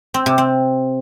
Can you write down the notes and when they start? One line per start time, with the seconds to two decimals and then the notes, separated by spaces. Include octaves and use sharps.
0.14 C4
0.26 C3
0.38 C4